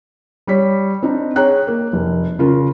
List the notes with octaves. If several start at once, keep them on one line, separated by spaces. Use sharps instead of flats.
G3 C#5 B6
C4 D4 D#4
G#4 C#5 G5 A#5 F#6
A#3
F1
C#3 F4 A#4